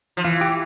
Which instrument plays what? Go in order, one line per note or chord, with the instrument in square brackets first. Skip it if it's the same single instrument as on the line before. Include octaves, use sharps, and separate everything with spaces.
[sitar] F3
[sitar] E3 [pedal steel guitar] F4
[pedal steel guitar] G4